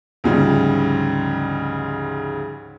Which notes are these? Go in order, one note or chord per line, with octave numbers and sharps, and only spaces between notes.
D2 G#2 C#3 F3 G3